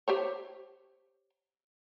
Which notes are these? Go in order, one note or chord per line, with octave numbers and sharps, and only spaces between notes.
G4 C5 C#5